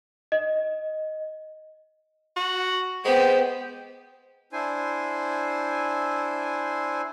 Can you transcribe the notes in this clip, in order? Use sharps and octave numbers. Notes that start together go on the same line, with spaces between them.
D#5
F#4
G#3 B3 G4 C5
D4 E4 C5 G#5